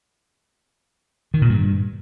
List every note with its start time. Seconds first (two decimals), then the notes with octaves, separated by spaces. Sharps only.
1.34 D#3
1.42 A#2
1.49 G2